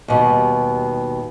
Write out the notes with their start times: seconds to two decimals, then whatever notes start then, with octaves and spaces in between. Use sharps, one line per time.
0.08 D#2 B2 G3